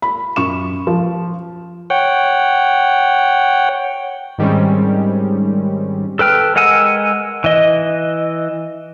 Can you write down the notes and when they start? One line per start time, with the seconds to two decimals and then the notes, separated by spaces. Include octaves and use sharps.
0.02 B5
0.36 F#2 C#6 E7
0.87 F3
1.90 C#5 F#5 G5
4.38 G#2 D#3 G3 G#3 C4 C#4
6.19 A4 B4 G5 F6
6.55 G#3 A#4 F#5 G#5 E6
7.44 E3 D#5